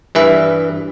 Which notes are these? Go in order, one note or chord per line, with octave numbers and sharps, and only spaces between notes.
G2 E3 B4 E5